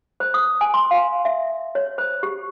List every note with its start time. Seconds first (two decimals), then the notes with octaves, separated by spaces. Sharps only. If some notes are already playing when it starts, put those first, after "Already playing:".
0.20 C5
0.34 D#6
0.61 G#5
0.74 C6
0.91 F5
1.25 E5
1.75 C#5
1.98 C5
2.23 G4